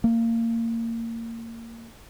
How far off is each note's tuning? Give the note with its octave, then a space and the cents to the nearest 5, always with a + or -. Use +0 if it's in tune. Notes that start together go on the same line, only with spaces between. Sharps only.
A#3 -25